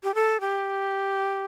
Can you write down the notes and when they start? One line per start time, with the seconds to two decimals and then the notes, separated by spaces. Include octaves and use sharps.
0.03 G4
0.15 A4
0.41 G4